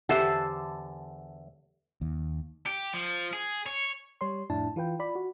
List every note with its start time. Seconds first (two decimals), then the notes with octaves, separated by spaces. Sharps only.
0.09 E2 D3 G4 A4 C5 E5 F#5
2.01 D#2
2.66 G4
2.93 F3
3.33 G#4
3.66 C#5
4.21 G3 C#5 C6
4.50 F2 A2 D4 E4 A5
4.76 E3 F4 B4 G5
4.99 F4 D5 B5
5.15 F#4